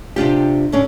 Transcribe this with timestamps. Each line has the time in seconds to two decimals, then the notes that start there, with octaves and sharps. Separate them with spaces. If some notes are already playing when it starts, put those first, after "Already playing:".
0.16 C3 D4 F4 G4
0.72 D3 C#4 D4